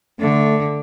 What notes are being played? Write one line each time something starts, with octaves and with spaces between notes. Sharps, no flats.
D3 A3